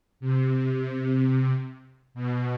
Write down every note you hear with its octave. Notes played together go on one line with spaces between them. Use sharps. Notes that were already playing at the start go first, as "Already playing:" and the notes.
C3
B2